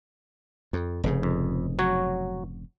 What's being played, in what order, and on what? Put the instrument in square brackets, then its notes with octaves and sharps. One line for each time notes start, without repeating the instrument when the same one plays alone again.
[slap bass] F2
F1 G#2 C#3
[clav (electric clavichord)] F2
F#3 F#4 C#5